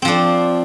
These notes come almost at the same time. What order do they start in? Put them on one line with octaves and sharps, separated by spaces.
C4 F3 D4